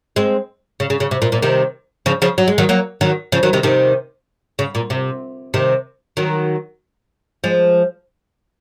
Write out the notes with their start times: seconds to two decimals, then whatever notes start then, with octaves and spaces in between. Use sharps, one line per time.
0.16 G#3 C4
0.80 C#3
0.90 C#3
1.00 C#3
1.11 C3
1.22 A#2
1.32 A#2
1.42 C3 D#3
2.06 C#3 F3
2.22 C#3 F3
2.38 F#3
2.48 G#3
2.58 D#3 F#3
2.69 F#3 A#3
3.01 D#3 F#3
3.32 C#3 F3
3.43 D#3 F#3
3.53 C3 D#3
3.63 C3 D#3
4.59 C#3
4.75 A#2
4.90 C3
5.54 C3 D#3
6.17 D#3 F#3
7.44 F3 G#3